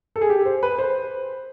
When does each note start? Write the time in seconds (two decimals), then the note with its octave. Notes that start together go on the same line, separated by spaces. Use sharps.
0.16 A4
0.21 G#4
0.30 G4
0.46 C5
0.63 B4
0.79 C5